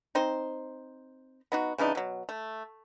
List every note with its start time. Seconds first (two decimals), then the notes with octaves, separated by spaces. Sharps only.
0.15 C4 D#4 C5
1.52 B3 D#4 F#4
1.78 C#3 E3 D4 D#4
1.95 B2 F#3
2.29 A3